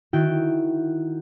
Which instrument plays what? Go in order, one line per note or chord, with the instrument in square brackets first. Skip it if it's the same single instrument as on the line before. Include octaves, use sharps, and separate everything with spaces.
[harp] D#3 E4 F#4 G5 G6 D7